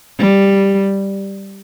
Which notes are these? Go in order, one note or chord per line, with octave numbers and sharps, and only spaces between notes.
G3